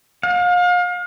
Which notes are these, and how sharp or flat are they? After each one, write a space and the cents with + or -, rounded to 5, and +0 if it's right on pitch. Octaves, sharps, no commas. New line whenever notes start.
F5 +35